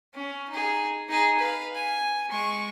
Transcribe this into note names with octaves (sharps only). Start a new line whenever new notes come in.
C#4
D#4 G#4
D#4 G#4
B4 F5
G#5
G#3 C#6